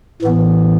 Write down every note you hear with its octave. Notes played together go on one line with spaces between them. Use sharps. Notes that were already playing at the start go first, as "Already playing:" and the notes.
A2 E3 B3